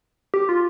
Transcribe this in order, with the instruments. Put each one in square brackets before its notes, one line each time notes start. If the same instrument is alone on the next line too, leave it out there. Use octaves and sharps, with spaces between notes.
[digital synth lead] G4
F4